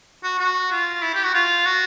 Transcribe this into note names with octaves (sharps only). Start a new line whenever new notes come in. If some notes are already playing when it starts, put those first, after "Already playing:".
F#4
F#4
F4
E4
G4
F#4
F4
F#4